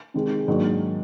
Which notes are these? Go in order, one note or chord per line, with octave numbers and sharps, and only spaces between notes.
C3 D#3 G#3
G#2 D#3 F#3 A#3 D4